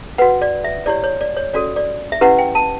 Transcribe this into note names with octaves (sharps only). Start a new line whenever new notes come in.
F#4 B4 F#5
D5
E5
E4 G4 C#5 D5
C#5
D5
C#5
C#4 F#4 A4 D5
D5
E5
C#4 E4 G4 B4 F#5
G5
A5